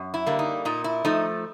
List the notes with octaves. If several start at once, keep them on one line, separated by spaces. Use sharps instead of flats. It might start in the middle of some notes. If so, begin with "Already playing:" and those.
Already playing: F#2
E4
D3 G3 A#3
D#4
A#2 D#4
E4
F3 A3 D#4